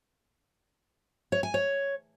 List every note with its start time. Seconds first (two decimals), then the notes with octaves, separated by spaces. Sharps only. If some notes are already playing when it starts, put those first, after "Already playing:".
1.32 C#5
1.43 G#5
1.54 C#5